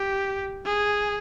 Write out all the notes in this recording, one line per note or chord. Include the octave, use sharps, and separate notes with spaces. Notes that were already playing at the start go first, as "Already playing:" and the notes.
Already playing: G4
G#4